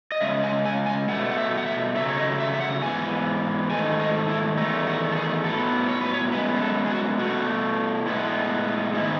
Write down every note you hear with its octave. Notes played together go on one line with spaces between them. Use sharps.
D#5
C#3 G#3 E5
G#5
G#5
G#5
B2 A3 F#5
F#5
E5
F#5
E5
C#3 F#3 A3 E5
C#5
D#5
E5
E5
F#5
G#2 E3 B3 G#5
G#2 D#3 A3 G#5
D#5
E4
E2 D#3 A3 D#4
F#4
A4
G#4
A2 F#3 B3 A4
C#5
B4
C#5
F#2 C#3 G#3 B3 B4
G#4
A4
G#4
F#4
B2 A3 F#4
A2 G#3 B3 E4
G#2 D#3 G#3 B3 E4